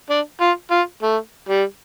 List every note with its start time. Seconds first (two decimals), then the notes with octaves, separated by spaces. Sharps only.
0.10 D4
0.41 F4
0.71 F4
1.03 A3
1.49 G3